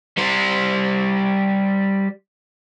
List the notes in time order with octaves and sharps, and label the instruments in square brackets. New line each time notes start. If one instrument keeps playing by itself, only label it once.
[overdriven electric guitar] G3 C5